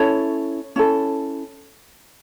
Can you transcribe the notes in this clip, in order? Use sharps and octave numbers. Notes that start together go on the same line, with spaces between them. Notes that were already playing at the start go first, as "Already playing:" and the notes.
Already playing: C#4 E4 A4 C#5
C#4 E4 A4